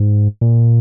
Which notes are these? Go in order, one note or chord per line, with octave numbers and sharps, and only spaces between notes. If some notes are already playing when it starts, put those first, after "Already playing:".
Already playing: G#2
A#2